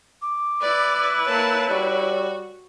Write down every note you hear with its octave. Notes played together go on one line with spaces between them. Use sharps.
D6
E4 B4 D5
A#3 C#5 A5
G3 F#4